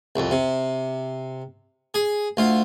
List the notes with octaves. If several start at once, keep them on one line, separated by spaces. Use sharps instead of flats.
C2 F2
C3
G#4
D2 F4